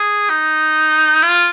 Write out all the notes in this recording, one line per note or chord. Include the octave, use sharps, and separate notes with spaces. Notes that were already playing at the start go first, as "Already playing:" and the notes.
Already playing: G#4
D#4
F4